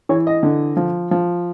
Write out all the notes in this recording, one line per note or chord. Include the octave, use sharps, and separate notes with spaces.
E3 C#5
D#5
D3
F3
F3